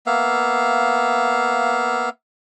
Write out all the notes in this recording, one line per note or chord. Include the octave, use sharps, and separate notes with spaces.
A#3 B3 E5 F5